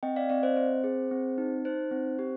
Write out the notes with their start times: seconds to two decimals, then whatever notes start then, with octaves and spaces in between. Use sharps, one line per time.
0.03 C4 D#5 G5
0.16 D5 F5
0.29 C4 D5 F5
0.43 C5 D#5
0.57 C4 C5
0.84 G#4
1.11 C4
1.38 D#4
1.65 D#4 C5
1.91 C4
2.19 G4